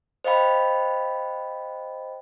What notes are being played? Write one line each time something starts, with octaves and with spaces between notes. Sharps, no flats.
C5 D#5 F5 G5 B5